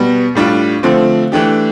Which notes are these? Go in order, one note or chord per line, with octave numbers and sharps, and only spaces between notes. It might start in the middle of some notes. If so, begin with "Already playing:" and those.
Already playing: B2 G3 B3
A2 G3 D4 F4
D3 F3 A3 C4
E3 A3 D4 G4